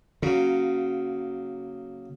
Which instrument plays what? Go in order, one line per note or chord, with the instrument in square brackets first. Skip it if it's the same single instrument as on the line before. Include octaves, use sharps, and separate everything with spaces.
[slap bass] C#3 [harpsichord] F#3 A#3